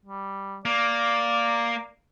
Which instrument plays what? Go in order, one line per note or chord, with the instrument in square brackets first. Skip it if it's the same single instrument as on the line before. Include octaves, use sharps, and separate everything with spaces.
[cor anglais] G3
[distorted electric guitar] A#3 [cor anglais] D5